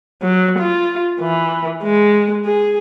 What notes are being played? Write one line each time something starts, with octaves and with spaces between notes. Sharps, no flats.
F#3
F4
E3
G#3
G#4